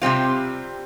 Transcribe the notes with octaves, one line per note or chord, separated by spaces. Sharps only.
C3 G3 C4 F4